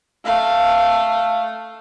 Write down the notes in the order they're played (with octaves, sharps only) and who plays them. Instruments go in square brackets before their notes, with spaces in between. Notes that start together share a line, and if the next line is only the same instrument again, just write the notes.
[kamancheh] A3 F5